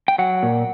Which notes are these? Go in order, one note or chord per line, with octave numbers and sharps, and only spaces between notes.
G5
F#3 F#5
A#2